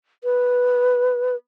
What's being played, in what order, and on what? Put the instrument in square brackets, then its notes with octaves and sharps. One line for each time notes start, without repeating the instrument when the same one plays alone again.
[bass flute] B4